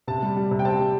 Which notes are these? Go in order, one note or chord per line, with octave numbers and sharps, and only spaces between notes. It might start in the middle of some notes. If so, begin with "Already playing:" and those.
C3 A5
G3
G3
C3
G5
C4 A5
G3